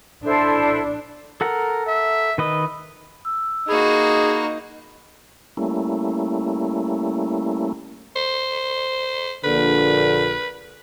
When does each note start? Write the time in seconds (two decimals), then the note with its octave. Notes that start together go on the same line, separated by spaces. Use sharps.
0.24 D4 E4 A4 C5
1.41 A4 A#4 F#5 A#5
1.87 E5
2.38 D#3 B4 D#5
3.25 E6
3.69 A#3 D#4 F#4 G#4 B5
5.57 G3 A3 A#3 C#4 E4
8.16 C5
9.44 A#1 A#2 D3 B4